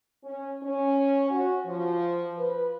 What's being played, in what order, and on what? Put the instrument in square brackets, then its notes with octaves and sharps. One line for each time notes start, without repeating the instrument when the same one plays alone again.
[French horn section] C#4
C#4
F#4
F3
B4